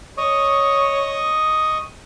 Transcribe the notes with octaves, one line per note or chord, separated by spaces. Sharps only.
C#5 D#5 C#6 D#6